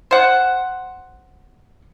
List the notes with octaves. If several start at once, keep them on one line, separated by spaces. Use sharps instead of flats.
C5 F#5